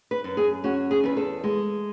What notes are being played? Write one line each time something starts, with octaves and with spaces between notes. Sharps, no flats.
B4
F#2
G#4
C#4 F#4
G#4
E2 B4
A4
G#3